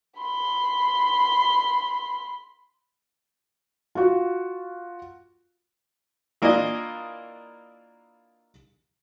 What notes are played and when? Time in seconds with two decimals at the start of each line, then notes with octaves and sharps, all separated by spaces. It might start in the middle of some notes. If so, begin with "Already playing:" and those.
0.19 B5 C6
3.95 F4 F#4
6.42 E3 A#3 D4 F4 D#5